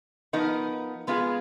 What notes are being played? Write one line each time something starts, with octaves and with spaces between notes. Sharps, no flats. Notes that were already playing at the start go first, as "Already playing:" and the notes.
F3 B3 D#4 A#4
G#3 B3 F4 G#4